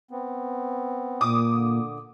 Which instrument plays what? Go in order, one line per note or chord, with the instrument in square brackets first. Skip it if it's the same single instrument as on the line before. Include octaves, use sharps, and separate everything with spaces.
[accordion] B3 C4
[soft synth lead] A#2 [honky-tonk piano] D6 D#6
[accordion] D3